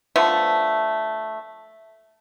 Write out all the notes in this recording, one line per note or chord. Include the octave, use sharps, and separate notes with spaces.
D3 F3 A3 B3